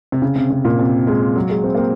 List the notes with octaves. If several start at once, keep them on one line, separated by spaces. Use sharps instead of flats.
C3
C#3
C3
C3
A#2
C3
G#3
F#3
G#3
C4
A#3
C4